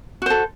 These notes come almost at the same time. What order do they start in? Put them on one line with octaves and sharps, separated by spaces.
F#4 C5 A4